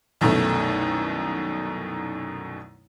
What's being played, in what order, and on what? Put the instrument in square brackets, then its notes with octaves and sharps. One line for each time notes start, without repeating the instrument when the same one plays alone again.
[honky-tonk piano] C2 F#2 B2 D#3 A3